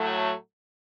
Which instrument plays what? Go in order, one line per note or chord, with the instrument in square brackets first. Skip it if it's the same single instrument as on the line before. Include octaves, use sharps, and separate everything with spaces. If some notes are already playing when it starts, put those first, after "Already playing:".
Already playing: [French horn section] A2 F#3 A3